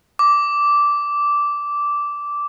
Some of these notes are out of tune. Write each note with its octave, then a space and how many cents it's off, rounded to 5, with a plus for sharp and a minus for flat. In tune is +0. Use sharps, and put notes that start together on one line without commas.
D6 -10